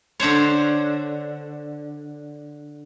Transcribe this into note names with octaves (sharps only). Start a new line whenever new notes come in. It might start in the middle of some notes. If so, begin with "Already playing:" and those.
D3 D4 C5 C#5